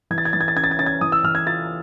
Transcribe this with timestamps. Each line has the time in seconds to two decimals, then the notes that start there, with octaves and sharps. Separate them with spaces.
0.11 E3 G#6
0.18 A6
0.25 G#6
0.33 E3 A6
0.41 G#6
0.48 A6
0.56 C#4 G#6
0.64 A6
0.71 G#6
0.78 C#4 A6
0.86 G#6
1.01 E3 D#6
1.12 E6
1.24 E3 F6
1.35 G#6
1.47 F4 A6